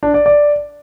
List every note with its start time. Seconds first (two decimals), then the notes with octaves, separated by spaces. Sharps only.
0.03 D4
0.14 D5
0.26 D5